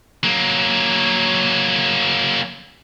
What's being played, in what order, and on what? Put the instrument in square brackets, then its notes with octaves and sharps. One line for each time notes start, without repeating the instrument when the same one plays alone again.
[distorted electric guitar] F#3 A#3